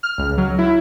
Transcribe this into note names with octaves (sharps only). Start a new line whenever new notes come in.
F6
C#2
F#3
E4